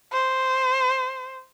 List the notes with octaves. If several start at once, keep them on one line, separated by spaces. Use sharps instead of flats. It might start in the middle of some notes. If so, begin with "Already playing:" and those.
C5